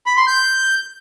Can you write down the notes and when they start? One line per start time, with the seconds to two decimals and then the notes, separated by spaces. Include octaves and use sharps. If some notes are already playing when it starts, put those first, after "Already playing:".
0.06 B5
0.17 C6
0.27 G6